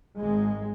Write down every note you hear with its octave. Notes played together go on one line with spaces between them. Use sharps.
G#1 G#2 G#3